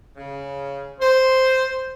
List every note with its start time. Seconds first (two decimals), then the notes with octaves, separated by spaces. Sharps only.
0.17 C#3
1.00 C5